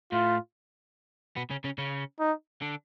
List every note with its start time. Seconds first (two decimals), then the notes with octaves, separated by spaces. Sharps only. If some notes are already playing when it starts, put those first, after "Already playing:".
0.12 A2 A3 F4
1.36 B2 B3
1.50 C#3 C#4
1.64 C#3 C#4
1.78 C#3 C#4
2.19 D#4
2.62 D3 D4